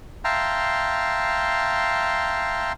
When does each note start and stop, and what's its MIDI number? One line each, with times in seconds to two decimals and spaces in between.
0.24 2.73 76
0.24 2.73 77
0.24 2.73 79
0.24 2.73 81
0.24 2.73 82
0.24 2.73 84